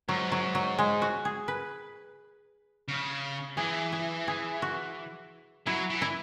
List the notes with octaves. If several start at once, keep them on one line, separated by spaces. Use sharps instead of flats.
G#2 F#3
F#3
F#3
G#3
F#4
G#4
B4
C#3
E3 G#4
G#4
G#4
F#4
F#3 E4
E3
E4